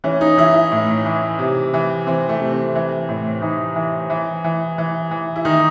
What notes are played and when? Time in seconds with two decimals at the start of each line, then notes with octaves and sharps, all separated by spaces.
0.04 E3 C#4
0.21 D#4
0.38 E3 E4
0.54 E4
0.72 A2
1.06 E3
1.39 C3
1.74 E3
2.07 E3 C4
2.29 A3
2.41 C3
2.52 C4
2.75 E3
3.09 A2
3.42 E3 D#4
3.76 E3
4.10 E3
4.44 E3
4.78 E3
5.11 E3
5.36 E4
5.45 D#3 D#4